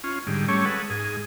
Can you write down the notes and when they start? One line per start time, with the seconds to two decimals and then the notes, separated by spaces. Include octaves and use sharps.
0.04 C#4 F4
0.27 G#2 D3 G3
0.48 G3 A3 C#4 C#5
0.65 G#3 A4 B4 F#5
0.90 G#2 G#4